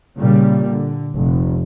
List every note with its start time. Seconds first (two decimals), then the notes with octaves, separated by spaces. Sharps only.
0.18 A#2 C#3 G3
0.68 D3
1.14 F1